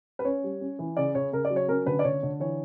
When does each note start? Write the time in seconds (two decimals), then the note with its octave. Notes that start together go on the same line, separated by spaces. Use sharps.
0.19 B4
0.25 C#4 C#5
0.44 G3
0.61 C#4
0.79 E3
0.97 C#3 D5
1.15 C#3 C#5
1.32 C#3 A#4
1.45 D5
1.50 F#3
1.56 C#5
1.68 C#4 A#4
1.86 D3 B4
1.99 D5
2.04 D3 C#5
2.23 D3
2.40 E3 C#5